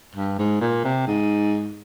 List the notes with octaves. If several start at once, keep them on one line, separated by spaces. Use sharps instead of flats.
G2
G#2
A#2
C3
G#2